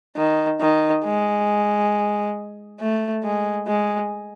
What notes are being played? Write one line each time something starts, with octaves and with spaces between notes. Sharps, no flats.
D#3
D#3
G#3
A3
G#3
G#3